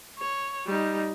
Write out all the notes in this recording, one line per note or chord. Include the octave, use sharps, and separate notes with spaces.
C#5
G3 D#4